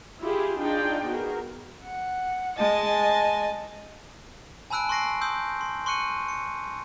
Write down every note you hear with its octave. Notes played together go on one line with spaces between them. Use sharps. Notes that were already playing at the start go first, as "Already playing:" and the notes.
E4 F4 G4 G#4
D4 D#4 F4 G#4 D5 G5
B3 F#4 G#4 A#4
F#5
G#3 D#5 G#5 A5 A6
G#5 A5 B5 E6 F#6 D7
C6 C#6 F#6 A#6 C7 D7
C6 D#6 E6 G6
C6
C6 C#6 F#6 C#7 D#7
C#7